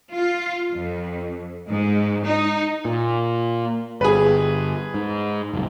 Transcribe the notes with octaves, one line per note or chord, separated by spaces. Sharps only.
F4
F2
G#2
D#4
A#2
G1 G#4 B4
G#2
F#1 C2